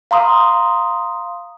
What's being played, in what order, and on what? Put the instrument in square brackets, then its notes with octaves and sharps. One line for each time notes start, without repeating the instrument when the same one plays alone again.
[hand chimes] F5 A#5 C6 D#6